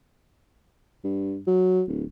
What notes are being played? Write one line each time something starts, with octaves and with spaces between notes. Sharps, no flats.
G2
F#3
D1